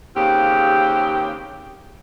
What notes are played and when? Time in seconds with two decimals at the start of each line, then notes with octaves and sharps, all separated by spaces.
0.15 D#2 C#3 C4 G4